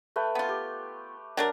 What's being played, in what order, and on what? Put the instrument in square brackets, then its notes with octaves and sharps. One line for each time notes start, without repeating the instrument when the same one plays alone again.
[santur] A3 B4 G5
[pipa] B3 F4
[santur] G4
[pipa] F#3 D4 A#4